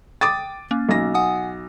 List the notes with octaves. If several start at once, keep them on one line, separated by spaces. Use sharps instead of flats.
G5 D6 D#6 A6
A#3 C#4
B1 A#6
F#5 G#5 D#6